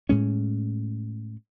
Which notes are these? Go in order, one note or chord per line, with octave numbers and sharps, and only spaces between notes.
A2 G#3 C#4